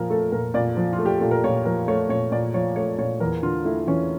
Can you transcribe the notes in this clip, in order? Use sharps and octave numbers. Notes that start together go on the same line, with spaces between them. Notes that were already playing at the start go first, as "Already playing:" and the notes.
Already playing: A#2 F3 A#4
A3 A4
A#2 A#4
A#2 D5
F3
F4
A3
G4
A#2 A4
A#4
A#2 C#5
F3 A#4
A3 C#5
A#2 C#5
A#2 D5
F3 C#5
A3 C#5
A#2 C#5
E2 A#4
D3 F4
A3 E4
E2 C#4